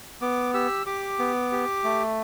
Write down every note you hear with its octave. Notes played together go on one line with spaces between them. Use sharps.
B3 D6
G4 E6
G4 D6
B3
G4
A3